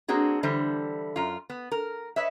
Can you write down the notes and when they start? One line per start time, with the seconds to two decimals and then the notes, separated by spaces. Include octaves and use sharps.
0.08 A#3 C4 D4 F#4 G#4
0.43 D3 E3 G3 C5
1.16 F#2 F4
1.50 B3
1.72 A#4
2.16 B4 C#5 D#5 E5